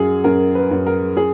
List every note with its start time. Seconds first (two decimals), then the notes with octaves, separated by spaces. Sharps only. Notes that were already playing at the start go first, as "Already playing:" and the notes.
Already playing: F#2 F#3 G#4
0.24 F#2 A#4
0.55 B4
0.71 F#2
0.87 A#4
1.17 G#4